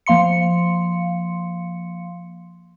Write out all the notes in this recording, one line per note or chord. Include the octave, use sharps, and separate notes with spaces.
F3 A#3 F5 C6 C#7